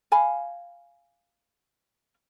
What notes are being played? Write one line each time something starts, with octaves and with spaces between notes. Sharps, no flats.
F5 G#5 B5